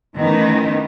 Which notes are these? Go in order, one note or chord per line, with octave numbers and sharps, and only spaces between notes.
D#3 E3 A3 B3 C#4 D#4